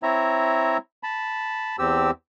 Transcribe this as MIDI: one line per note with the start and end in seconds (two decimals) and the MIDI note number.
0.03 0.77 60
0.03 0.77 64
0.03 0.77 73
0.03 0.77 76
0.03 0.77 82
1.03 1.76 81
1.03 1.76 83
1.79 2.11 40
1.79 2.11 60
1.79 2.11 67
1.79 2.11 88